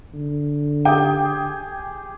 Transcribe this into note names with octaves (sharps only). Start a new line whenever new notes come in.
D3
G4 G#4 G5